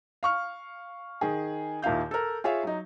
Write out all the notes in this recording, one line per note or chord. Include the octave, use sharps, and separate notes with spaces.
F5 C#6 F6
D#3 G#4
D#2 A#2 E4 F5 G6
A4 A#4
F4 G#4 C#5 E5 F5
F#3 D#4